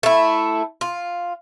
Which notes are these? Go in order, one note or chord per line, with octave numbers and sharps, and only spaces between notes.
A3 E4
F4